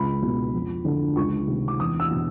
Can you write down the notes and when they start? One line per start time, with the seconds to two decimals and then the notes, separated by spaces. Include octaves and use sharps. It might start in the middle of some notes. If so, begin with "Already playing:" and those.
Already playing: C#2 B5
0.22 B2
0.53 F2
0.85 D3
1.16 C#2 C#6
1.47 C3 D#3
1.68 D6
1.79 E2 D#6
2.00 E6
2.11 B2